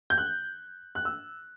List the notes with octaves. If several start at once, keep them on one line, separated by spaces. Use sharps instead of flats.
G6
F#6
F#6
E6